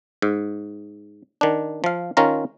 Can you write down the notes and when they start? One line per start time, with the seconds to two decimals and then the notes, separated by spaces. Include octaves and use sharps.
0.22 G#2
1.41 D#3 D4
1.84 F3 F5
2.17 D#3 C#4 F4 A#5